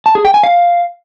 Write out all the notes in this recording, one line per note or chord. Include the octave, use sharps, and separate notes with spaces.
A5
G#4
G5
G#5
F5